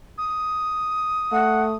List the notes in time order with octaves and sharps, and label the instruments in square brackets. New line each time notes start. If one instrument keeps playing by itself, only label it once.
[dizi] D#6
[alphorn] A3 [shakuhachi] F#5